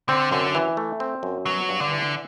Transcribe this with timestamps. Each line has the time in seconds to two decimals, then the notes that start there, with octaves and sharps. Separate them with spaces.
0.09 D3 C4
0.32 F#2 D3
0.55 E3
0.77 A3
1.00 C4
1.23 F#2
1.46 F#3 B3
1.69 G2
1.80 D3
1.91 E3